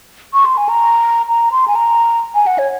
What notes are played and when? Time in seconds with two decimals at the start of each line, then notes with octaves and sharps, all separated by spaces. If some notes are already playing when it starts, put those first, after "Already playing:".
0.33 C#6
0.45 C6
0.57 G#5
0.69 A#5
1.28 A#5
1.52 C6
1.68 G#5
1.75 A#5
2.35 G#5
2.47 F#5
2.59 C#5